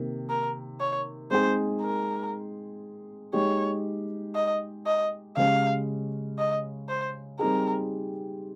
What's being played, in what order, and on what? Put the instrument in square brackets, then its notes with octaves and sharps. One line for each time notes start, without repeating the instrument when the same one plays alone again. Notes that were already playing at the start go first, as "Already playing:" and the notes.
Already playing: [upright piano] C3 D#3 A#3
[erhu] A#4
C#5
[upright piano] G#3 C4 D#4 G#4 [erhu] C5
[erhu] A#4
[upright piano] G#3 D#4 G4 [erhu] C#5
[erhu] D#5
D#5
[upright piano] C#3 G#3 C#4 G4 [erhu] F5
[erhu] D#5
C5
[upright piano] G3 C4 D#4 G#4 [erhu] A#4